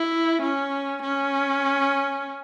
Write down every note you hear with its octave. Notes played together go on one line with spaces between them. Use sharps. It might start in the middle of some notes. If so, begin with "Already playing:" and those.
Already playing: E4
C#4
C#4